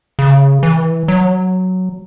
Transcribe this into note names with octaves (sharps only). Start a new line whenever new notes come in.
C#3
E3
F#3